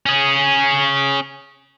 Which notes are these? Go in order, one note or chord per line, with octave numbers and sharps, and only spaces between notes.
C#4 G#4